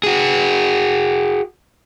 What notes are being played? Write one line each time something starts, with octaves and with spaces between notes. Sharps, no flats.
F#4 G#4